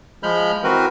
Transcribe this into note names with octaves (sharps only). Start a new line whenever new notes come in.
F3 G#3 B5 F6 G6
E3 C4 F#4 A#4 B4